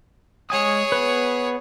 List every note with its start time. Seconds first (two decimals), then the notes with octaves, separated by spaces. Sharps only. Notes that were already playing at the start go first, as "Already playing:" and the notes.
0.50 G#3 G#4 C#5 G#5 D#6
0.92 B3 B4